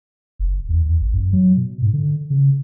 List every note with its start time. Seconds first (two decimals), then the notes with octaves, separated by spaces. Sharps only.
0.39 F#1
0.69 E2
0.85 E2
1.01 G#1
1.14 F#2
1.33 F#3
1.57 B2
1.82 G#2
1.93 D3
2.30 C#3